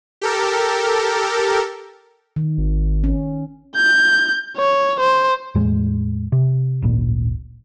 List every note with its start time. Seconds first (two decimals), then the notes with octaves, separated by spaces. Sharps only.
0.21 G4 A4 A#4
2.36 D#3
2.58 G#1
3.04 C#4
3.76 G6
4.57 C#5
5.00 C5
5.55 E2 A2 G#3
6.32 C3
6.82 D1 G#1 A#2